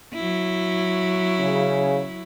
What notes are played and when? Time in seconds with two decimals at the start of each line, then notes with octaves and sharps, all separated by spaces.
0.14 F#3 E4
1.39 C#3